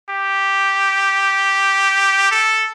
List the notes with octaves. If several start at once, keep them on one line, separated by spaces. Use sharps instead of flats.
G4
A4